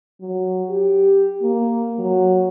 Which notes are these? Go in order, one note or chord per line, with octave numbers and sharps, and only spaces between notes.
F#3
G4
A#3
F#3